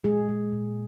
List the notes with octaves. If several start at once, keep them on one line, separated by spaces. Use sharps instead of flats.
A#2 G#3 G#4
G#3
A#2